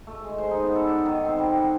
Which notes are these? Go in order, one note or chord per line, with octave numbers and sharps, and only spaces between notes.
A3
G#3
C5
D#4
B3
A4
D4
D#3
C4
G3
F#5